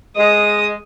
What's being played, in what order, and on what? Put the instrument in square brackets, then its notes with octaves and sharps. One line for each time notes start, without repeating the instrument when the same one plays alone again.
[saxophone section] G#3 [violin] D#6